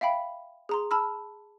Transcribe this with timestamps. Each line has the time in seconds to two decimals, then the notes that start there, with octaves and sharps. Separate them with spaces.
0.01 E5 F5 G5 B5
0.69 G#4 A#5 C6
0.91 A5 B5 E6 F6